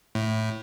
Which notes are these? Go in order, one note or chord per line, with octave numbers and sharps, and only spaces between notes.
A2